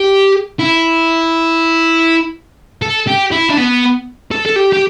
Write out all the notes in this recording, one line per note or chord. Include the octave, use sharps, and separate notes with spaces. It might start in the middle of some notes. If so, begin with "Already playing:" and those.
Already playing: G4
E4
A4
G4
E4
D4
B3
A4
A4
G4
G4